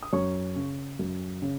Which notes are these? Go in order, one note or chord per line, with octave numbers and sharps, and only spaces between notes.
D#6
F#2 C#5 C#6
C#3
F#2
C#3